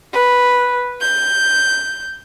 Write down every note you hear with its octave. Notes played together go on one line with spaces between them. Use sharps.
B4
G6